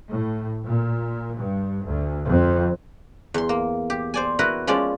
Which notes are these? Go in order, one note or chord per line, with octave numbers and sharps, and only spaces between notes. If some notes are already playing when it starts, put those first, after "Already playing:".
A2
A#2
G2
D2
F2
E2 C6
A#3
G4
C5 D5 G#5
E4 F#4 A#4 B4
F3 G#3 C#4 D5